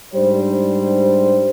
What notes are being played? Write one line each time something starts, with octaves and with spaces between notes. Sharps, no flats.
G#2 G3 D4 C5